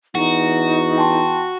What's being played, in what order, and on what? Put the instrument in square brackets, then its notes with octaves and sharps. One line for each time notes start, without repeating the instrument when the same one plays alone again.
[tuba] E2 [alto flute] D#4 [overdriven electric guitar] F#4
[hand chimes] G5 A5 C6